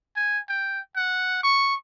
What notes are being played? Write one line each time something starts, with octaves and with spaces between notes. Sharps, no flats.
G#5
G5
F#5
C#6